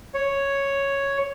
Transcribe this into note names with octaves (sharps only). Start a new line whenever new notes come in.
C#5